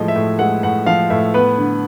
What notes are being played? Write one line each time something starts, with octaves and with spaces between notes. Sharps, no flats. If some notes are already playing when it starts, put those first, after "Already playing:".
Already playing: A2 F3 G#3 D#5
E5
A2
G#3 F#5
A2 F#5
F3 F5
A2 E5
B3 B4
D3